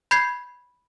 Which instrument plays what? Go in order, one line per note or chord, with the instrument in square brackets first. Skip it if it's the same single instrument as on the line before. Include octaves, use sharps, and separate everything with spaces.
[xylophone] B5 G6 G#6 C7